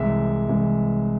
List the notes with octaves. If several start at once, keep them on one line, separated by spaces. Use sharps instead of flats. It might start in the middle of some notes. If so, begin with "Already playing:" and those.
Already playing: C2 C3 E3 G#3 E5
C2 C3 E3 G#3